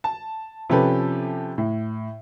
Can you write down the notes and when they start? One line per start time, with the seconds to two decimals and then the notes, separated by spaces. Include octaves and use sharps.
0.04 A5
0.70 C3 F3 C#4 G4 A4 B4
1.58 A2